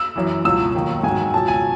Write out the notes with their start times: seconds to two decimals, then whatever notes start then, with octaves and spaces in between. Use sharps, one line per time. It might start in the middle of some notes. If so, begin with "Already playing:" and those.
Already playing: E6
0.16 F#2 E3
0.45 C#2 B2 F#3 E6
0.75 D#2 D#3 F#3
1.03 G#2 D#3 F#3 G#5
1.34 C#2 B2 F#3 A5
1.48 G#5